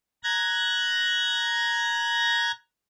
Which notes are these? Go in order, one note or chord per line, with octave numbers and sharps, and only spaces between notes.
A#5 F#6 G#6 A#6